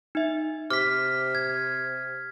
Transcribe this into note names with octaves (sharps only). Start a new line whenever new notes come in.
D#4 E5
C3 D6 F6 B6
G#6